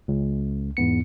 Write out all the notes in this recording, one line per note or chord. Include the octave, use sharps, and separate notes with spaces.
C#2
E2 G#2 B3 C#7